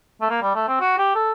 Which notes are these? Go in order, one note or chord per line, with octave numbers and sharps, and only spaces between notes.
A3
A#3
G3
A3
C4
F#4
G4
A4